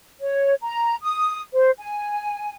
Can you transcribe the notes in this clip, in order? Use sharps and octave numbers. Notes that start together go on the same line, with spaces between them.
C#5
A#5
D#6
C5
G#5